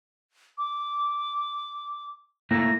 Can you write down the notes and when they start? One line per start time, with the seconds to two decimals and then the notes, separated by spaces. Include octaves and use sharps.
0.58 D6
2.51 A3 A#3 E4 A#6